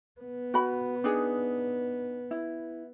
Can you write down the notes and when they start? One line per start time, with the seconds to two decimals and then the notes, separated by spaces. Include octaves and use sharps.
0.21 B3
0.54 F#4 B5
1.04 D4 D#4 G#4
2.31 E4